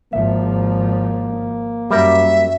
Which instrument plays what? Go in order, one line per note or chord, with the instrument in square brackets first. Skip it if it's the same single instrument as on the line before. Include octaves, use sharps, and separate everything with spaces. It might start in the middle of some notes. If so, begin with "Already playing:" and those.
[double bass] G#1 F3 [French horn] A#3 [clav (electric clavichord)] E5
[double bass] F#2 [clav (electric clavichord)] G3 A#4 [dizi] E5